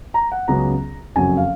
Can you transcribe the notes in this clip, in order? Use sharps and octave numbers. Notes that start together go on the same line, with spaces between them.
A#5
F#5
C#2 C#3 F#3 B3 A#5
F#1 F2 C#3 F#3 G#5
F5